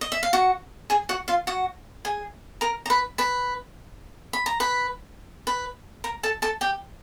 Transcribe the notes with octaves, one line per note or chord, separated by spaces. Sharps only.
D#5
E5
F5
F#4 F#5
G#4 G#5
F#4 F#5
F4 F5
F#4 F#5
G#4 G#5
A#4 A#5
A#5
B4 B5
B4 B5
B5
A#5
B4 B5
B4 B5
A#4 A#5
A4 A5
A4 A5
G4 G5